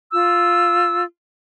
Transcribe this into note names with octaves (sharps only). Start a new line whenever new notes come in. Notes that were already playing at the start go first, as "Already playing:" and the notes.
F4 E6